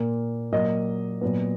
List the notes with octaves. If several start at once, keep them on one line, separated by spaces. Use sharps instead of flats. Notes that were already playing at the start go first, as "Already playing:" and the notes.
Already playing: A#2 A#3
A#2 F#3 A#3 D#5
A#2 F#3 B3